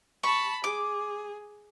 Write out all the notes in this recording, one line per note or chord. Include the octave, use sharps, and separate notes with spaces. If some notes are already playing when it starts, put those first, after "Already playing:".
A5 B5 C#6
G#4 D6